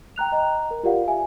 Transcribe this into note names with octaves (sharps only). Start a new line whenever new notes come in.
G5 A#5 F#6 F7
D#5 A#5
A#4
F4 G4 A#4 D5 F5 F#5
E5 G#5